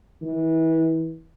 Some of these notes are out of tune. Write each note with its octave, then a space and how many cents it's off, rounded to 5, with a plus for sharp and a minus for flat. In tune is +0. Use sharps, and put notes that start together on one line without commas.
E3 -30